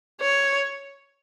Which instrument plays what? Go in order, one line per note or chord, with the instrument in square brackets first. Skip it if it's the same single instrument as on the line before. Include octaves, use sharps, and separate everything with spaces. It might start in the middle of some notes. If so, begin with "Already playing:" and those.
[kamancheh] C#5